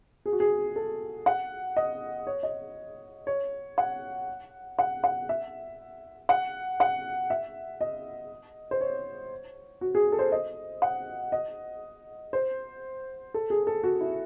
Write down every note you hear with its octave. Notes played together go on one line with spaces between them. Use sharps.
G#4
F#4
G#4
A4
F#5
D#5
C#5
D#5
C#5
F#5
F#5
F#5
E5
F#5
F#5
E5
D#5
C5
C#5
F#4
G#4
A4
C5
D#5
F#5
D#5
C5
A4
G#4
A4
F#4
E4